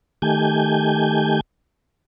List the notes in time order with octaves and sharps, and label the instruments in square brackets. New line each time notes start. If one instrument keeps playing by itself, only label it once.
[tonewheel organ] D#3 A3 G4 G#5 G6